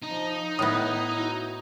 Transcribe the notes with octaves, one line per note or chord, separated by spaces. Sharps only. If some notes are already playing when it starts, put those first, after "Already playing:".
F3 D#4
A2 B3 E4 D#6
F#4